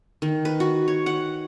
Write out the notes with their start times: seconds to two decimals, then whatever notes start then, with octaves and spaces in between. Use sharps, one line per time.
0.22 D#3
0.45 B4
0.60 F#4
0.88 C#5
1.06 F#5